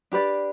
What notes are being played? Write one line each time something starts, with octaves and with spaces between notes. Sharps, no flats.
D4 G4 B4 D5